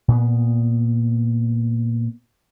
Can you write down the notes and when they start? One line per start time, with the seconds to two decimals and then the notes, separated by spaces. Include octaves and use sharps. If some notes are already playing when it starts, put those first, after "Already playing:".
0.08 A#2 B3